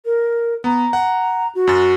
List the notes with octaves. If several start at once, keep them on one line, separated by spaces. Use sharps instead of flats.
A#4
B3 A#5
F#5
F#4
F#2 A6